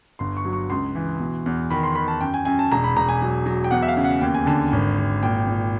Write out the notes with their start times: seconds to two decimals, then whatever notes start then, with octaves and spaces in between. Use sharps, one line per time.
0.19 G1 C6
0.37 C#6
0.45 F#3
0.53 C#6
0.70 C#2 C6
0.95 E3
1.20 B2
1.46 E2
1.71 D#3 B5
1.83 C6
1.95 D#3 B5
2.08 A5
2.21 F#2 G5
2.34 G#5
2.45 F#2 G#5
2.59 A5
2.71 E1 A#5
2.84 B5
2.96 E1 A#5
3.09 G#5
3.22 F#3
3.46 F#3
3.64 G5
3.71 E2 F#5
3.82 E5
3.88 F5
3.97 C#3
4.04 F#5
4.21 D#2 G5
4.34 G#5
4.46 D3 A5
4.73 G#1
4.98 G#1
5.23 A#2 G5
5.47 A#2